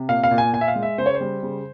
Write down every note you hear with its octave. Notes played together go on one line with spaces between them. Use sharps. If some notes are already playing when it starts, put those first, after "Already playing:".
Already playing: C3
A#2 F5
F5
A#2
G#5
A#2 G#5
E5
F5
G#3
E5
C#3 C5
C#5
C5
G3
C#3